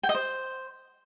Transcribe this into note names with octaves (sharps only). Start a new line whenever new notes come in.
G5
D#5
C5